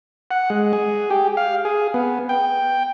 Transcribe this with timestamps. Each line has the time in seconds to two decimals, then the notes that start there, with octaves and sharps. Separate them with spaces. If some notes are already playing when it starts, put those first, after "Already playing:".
0.31 F#5
0.50 G#3
0.73 G#4
1.10 G4
1.37 F5
1.65 G#4
1.94 B3
2.29 G5